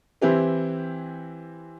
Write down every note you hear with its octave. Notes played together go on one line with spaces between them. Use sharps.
E3 C4 E4 G4 B4